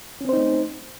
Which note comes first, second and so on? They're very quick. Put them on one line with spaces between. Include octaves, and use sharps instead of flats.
C#4 C4 C5 D#4 A3